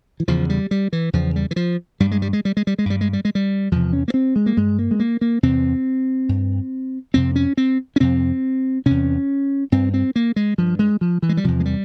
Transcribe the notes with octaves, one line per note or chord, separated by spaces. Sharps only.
E3
E2 C#3 F3
G3
G3
E3
E2 C#3 F3
G3
E3
F3
G2 G3
G#3
G3
G#3
G3
G#3
G3
G#3
G2 G3
G#3
G3
G#3
G3
E2 C3 F3
C#4
A#3
C4
G#3
A#3
G2 G#3
A#3
G#3
A#3
A#3
E2 C3 C4
G2
F2 C3 C4
C#4
C4
C#4
F2 C3 C4
E2 C3 C#4
G2 C4
C4
A#3
G#3
G2 F3
G#3
F3
E3
G#3
G3
E2 C3 F3
G#3
G3